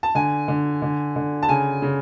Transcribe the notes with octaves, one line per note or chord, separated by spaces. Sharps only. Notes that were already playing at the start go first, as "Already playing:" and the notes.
A5
D3 G#5
D3
D3
D3
A5
C#3 G#5
C#3